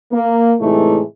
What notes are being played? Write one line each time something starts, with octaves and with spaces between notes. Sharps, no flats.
A#3
A2 C3 E3 G#3 A3 D#4